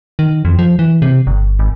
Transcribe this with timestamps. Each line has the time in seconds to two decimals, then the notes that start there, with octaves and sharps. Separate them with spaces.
0.19 D#3
0.45 F2
0.59 F3
0.79 E3
1.02 C3
1.27 G1
1.59 G#1